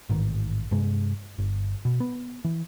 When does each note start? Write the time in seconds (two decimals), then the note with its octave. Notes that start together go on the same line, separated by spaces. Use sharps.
0.09 A1 G#2 D#3
0.71 G2 C3 G#3
1.38 G1
1.85 B2
2.00 B3
2.45 E3